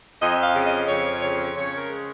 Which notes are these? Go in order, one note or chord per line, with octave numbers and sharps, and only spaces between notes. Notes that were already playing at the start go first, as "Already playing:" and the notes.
F2 D#5
F5
C#3
D#5
F2 C#5
C#3 C#5
C#3 C#5
A#4
G#3